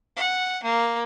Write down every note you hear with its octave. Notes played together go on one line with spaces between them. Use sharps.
F#5
A#3